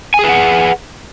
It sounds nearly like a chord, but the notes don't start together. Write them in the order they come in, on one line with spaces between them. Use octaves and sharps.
G#5 G#4 B4 F#5